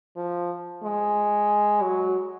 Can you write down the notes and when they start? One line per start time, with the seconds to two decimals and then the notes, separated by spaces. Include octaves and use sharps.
0.16 F3
0.83 G#3
1.82 F#3